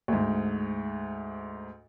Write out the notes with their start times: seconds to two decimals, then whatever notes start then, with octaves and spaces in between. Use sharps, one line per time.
0.08 D2 G#2